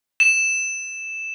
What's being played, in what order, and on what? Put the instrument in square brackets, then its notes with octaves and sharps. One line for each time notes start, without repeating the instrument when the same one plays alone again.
[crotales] E7